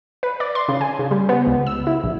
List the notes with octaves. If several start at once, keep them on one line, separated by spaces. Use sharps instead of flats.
B4
D5
C6
C#3
G#5
C#3
G3
B3
C#2
E6
E4
A#1